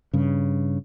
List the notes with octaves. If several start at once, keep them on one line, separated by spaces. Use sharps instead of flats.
G2 C#3